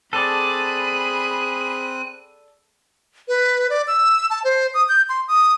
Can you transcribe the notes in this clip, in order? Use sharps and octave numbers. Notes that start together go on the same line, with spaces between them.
C4 G#4 A4 D5 B5 F#6 D#7
B4
D5
E6
A5
C5
D#6
G6
C6
D#6